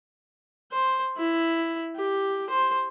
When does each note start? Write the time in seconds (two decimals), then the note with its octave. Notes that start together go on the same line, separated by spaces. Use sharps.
0.72 C5
1.17 E4
1.96 G4
2.50 C5